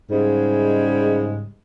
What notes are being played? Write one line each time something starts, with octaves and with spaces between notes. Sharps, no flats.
G#2 C#3 G3 G#3